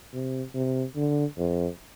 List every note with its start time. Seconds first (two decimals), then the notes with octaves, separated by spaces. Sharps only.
0.13 C3
0.54 C3
0.96 D3
1.38 F2